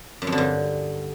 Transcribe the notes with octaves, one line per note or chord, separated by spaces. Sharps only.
F#2
F2
D3
G2